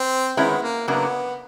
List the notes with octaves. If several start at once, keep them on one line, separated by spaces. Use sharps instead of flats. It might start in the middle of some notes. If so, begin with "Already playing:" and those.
Already playing: C4
D#3 G#3 B3 C#4 E4
A#3
F#2 C#3 F#3 A#3 B3 D4